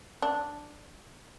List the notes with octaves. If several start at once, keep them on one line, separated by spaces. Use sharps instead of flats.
D4